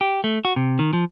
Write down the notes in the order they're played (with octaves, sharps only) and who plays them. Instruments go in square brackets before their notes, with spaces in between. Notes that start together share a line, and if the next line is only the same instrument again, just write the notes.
[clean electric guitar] G4
A3
F#4
C3
D#3
F3